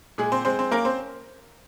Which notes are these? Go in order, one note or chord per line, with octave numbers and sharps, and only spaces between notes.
A#2 G#3 G#4
C4 C5
G#3 C4 C5
C4 C5
A#3 C#4 A#4
C4 C5